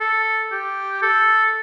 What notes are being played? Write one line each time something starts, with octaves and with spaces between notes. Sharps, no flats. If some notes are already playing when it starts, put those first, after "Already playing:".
A4
G4
A4